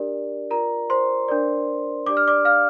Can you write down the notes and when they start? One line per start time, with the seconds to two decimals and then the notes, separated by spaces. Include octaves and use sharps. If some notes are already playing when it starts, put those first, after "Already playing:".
Already playing: D4 G4 A#4 D5
0.51 F4 A#4 D5 A#5
0.90 C5 C6
1.28 D4 A#4 D5
2.06 D4 G4 D5 D6
2.17 F6
2.27 D5 D6
2.45 F5 F6